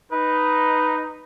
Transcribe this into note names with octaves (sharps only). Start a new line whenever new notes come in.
D#4 B4